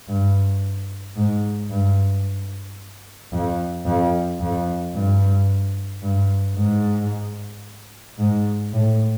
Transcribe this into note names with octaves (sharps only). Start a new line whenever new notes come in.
G2
G#2
G2
F2
F2
F2
G2
G2
G#2
G#2
A2